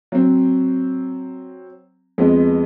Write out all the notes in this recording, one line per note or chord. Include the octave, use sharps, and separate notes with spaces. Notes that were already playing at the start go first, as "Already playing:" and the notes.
F#3 C4
F2 G#3 B3